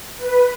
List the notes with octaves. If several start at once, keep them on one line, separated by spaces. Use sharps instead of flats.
B4